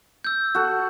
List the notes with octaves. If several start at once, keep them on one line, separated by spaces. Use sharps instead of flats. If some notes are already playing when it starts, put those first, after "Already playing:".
E6 G6
F#4 A4